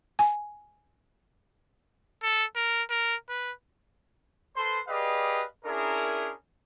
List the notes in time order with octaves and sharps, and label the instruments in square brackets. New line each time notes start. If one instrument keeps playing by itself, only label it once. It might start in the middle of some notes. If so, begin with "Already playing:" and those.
[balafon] G#5
[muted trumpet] A4
A#4
A#4
B4
[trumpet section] A4 B4 C5 C6
G4 G#4 B4 D5 D#5 F5
C#4 D4 E4 G#4 A#4